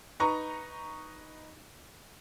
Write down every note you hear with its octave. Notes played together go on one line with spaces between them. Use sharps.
D#4 B4 A#5 C#6